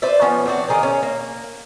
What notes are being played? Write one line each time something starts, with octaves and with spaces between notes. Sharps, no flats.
B4 C5 D5 E5
F3 B3 C#4
A3 C4 D4 F#4
D#3 G#4 A#4 C5
C#4
A#3